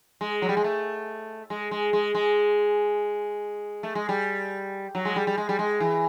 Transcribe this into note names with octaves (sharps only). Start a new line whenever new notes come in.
G#3
F#3
G3
G#3
A3
G#3
G#3
G#3
G#3
A3
G#3
G3
F#3
G#3
G3
G3
G#3
G3
G#3
E3